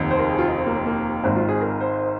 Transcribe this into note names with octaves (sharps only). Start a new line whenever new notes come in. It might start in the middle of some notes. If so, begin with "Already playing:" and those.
Already playing: F1 D#2 D#3
C5
A#4
G#4
F4
D#4
C4
A#3
C4
A#3
G#1 G#2 D#3 C4
F4
G#4
A#4
C5